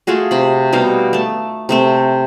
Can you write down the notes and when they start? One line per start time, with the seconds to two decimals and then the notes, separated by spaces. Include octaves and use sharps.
0.07 A3 F4 F#4 G#4
0.31 C3 B5
0.73 B2 G3 D#4 F5
1.13 A3 A5
1.69 C3 A3 C4